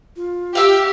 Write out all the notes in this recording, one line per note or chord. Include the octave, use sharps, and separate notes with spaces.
F4
G4 E5 F5